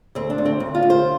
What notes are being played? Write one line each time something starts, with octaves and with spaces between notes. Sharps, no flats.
D2 C4
D4
D2
C4
D2
F4
D2
C5